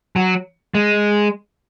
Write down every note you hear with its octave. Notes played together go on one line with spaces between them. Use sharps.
F#3
G#3